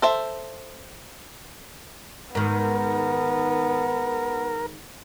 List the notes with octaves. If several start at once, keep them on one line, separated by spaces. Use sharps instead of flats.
A4 C5 E5
G#2 D#3 B3 A#4